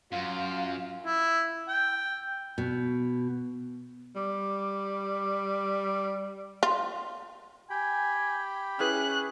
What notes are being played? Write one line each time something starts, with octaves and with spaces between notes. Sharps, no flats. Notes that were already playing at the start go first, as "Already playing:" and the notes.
F#2 F4 F5
E4
G5
B2
G3 D6
F4
G4 G5 G#5 B5
C#4 E4 G#4 B4 F#6